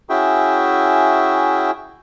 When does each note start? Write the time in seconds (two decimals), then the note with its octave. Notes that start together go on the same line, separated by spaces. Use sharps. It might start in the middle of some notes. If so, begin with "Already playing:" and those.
0.09 C#4 E4 F#4 G#4 E5 G5